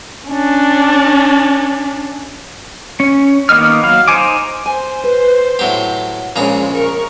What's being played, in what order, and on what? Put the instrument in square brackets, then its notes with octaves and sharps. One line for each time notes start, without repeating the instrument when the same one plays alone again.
[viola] C#4 D4
[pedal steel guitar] C#4
D#3 A#3 B3 D#5 F6
F#3 F5
D#4 C5 G#5 D6
[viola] C5 [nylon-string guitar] G#5
[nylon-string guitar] B4
[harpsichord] A2 F#3 G4
[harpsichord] A#1 C#3 A#5 [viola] G#3 C#5
[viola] A#4 C#6